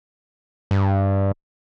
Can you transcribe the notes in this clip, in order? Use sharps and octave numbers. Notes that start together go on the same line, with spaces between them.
G2